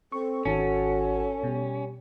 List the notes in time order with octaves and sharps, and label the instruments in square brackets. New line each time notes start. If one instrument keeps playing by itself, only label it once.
[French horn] C4 [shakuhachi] A4 [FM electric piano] C#6
[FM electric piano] G#1 D#3 A5 [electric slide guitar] C#4 [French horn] F#4
[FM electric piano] B2 [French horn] G3